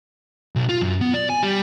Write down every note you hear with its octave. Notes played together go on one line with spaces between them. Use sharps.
B1
F4
F#2
B3
D5
G#5
G3